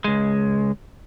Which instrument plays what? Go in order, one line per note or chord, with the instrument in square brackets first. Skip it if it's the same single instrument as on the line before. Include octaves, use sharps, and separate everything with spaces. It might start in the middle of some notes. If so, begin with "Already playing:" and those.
[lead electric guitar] C#2 G#3